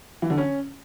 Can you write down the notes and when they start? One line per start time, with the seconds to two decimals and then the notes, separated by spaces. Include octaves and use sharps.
0.22 E3
0.30 D3
0.38 C#4